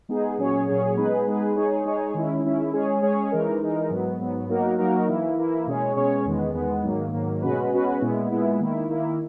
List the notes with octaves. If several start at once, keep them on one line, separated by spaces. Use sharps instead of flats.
G#3 B3 D#4 G#4
A#2 F#3 C#4 G#4 C#5
A#2 F#3 C#4 G#4 C#5
G#3 B3 D#4 G#4 B4
G#3 B3 D#4 G#4 B4
G#3 D#4 G#4 C#5
G#3 D#4 G#4 C#5
D#3 G#3 C#4 E4
D#3 G#3 C#4 E4
G#3 C#4 G#4 C#5
G#3 C#4 G#4 C#5
E3 G#3 D#4 A#4
E3 G#3 D#4 A#4
G#2 F#3 B3
G#2 F#3 B3
F#3 A#3 D#4 F#4 A#4
F#3 A#3 D#4 F#4 A#4
E3 A#3 E4
E3 A#3 E4
B2 G#3 C#4 G#4 C#5
B2 G#3 C#4 G#4 C#5
E2 D#3 G#3 B3
E2 D#3 G#3 B3
G#2 D#3 F#3 A#3
G#2 D#3 F#3 A#3
B2 G#3 C#4 F#4 B4
B2 G#3 C#4 F#4 B4
A#2 G#3 B3 E4
A#2 G#3 B3 E4
D#3 A#3 E4
D#3 A#3 E4